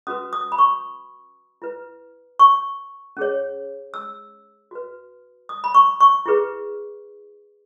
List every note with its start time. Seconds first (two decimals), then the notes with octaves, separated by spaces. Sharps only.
0.07 C#4 F#4 B4 D#6
0.33 D#6
0.52 B5
0.58 C#6
1.62 E4 B4
2.39 C#6
3.17 C#4 G#4 C#5
3.94 E6
4.71 F#4 B4
5.49 D#6
5.64 B5
5.75 C#6
6.00 C#6
6.26 E4 G#4 B4